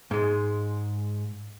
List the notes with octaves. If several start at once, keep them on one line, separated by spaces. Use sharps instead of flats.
G#2 G#3